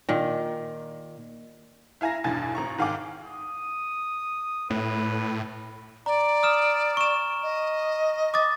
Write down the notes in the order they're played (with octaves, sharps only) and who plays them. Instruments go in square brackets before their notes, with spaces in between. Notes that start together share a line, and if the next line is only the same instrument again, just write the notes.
[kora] A#2 D#3
[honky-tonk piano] E4 F5 G#5 A#5 A#6
B1 E2 G2 G#5 G#6 A6
G#1 A#5 C#6
G#2 D#3 F5 F#5 G#5 D6
[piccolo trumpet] D#6
[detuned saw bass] A2 [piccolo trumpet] B4
[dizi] D5 [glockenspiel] A#5
[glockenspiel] D#6 F6 E7
C#6 E7
[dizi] D#5
[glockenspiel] D6 D#6 A6